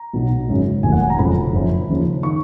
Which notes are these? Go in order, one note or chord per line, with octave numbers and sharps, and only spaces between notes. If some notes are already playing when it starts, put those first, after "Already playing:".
Already playing: A#5
B1 B2 F#3
G#1 F#2 C#3
F1 D#2 D#3 F#3 G#5
F#5
G#5
A#5
F1 F2 C#3 F#3 B5
F#1 F#2 F3
D#2 C#3 F3
D#3 C#6